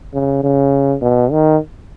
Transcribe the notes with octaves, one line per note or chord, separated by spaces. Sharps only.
C#3
C#3
B2
D#3